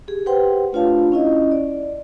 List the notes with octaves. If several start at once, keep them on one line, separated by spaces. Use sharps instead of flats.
G4 G#4
G4 B4 C5 F#5 G5 C6
A3 D4 F4 C#5 F5 A5
C#4 E4 D#5
D5